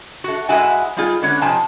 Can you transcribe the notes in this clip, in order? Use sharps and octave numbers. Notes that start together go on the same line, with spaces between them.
A3 F#4
G#2 G#3 E4 F#4 E5 G#5
G3 C4 D#4 F4 G#4
D3 G#3 B3 C#4 C#5
F2 C3 F3 D#4 G#5 A5